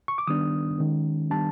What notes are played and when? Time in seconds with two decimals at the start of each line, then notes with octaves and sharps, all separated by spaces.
0.08 C#6
0.18 D6
0.27 D#3 G3 B3 D4 D#6
0.79 D#3 G#3 C#4
1.30 D#3 G3 B3 D4 A5